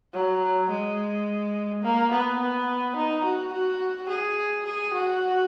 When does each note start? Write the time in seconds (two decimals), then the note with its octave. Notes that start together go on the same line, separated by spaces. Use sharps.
0.13 F#3
0.70 G#3
1.83 A#3
2.12 B3
2.40 B3
2.96 D#4
3.24 F#4
3.53 F#4
4.09 G#4
4.65 G#4
4.94 F#4